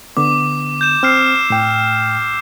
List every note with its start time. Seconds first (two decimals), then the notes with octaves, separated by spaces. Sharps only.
0.17 D3 B3 D6
0.81 G6 E7
1.03 C4 E6 F6 C7
1.50 A2 G5